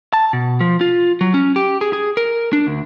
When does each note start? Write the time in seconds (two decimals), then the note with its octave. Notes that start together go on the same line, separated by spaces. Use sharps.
0.13 A5
0.33 B2
0.61 F3
0.81 F4
1.21 F#3
1.34 C#4
1.56 G4
1.81 G#4
1.93 G#4
2.17 A#4
2.53 D4
2.67 D2